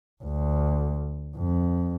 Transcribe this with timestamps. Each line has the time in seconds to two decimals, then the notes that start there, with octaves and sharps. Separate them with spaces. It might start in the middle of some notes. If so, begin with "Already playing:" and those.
0.23 D2
1.36 F2